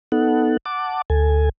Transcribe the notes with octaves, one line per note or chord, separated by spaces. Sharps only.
B3 D#4 A4 F#5
F#5 A5 D6
D2 A4 G#5